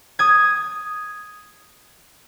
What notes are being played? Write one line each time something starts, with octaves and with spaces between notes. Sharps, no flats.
D#6 G#6